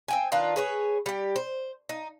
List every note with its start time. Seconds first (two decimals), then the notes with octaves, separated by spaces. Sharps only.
0.08 C4 G5 G#5
0.32 D#3 D4 F4 B4
0.56 G#4 B4 C#5
1.06 G3 G4
1.36 C5
1.89 D#4